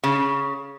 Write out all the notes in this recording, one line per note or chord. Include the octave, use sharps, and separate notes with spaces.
C#3